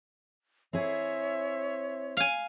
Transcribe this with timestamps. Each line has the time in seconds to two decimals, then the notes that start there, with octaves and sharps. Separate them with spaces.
0.73 C4 E4 G#4 C#5 E5
2.17 F5 G#5